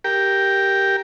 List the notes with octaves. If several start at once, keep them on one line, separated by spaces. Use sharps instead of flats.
G4 A#4 G5